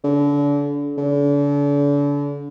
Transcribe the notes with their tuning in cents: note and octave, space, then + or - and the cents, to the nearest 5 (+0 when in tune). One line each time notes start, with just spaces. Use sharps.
D3 -35
D3 -40